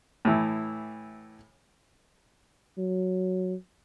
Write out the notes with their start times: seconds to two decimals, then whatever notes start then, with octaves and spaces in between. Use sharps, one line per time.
0.25 A2 E3
2.78 F#3